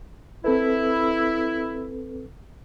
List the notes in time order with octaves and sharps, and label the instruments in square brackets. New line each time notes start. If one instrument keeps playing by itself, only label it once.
[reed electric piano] C4 A4 B4 [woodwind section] E4